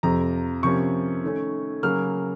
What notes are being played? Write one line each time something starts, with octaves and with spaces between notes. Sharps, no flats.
F2 C3 F3 A#5
C3 F3 A#3 C#4 C#6
D#3 A3 C#4
C#3 F#3 A#3 F6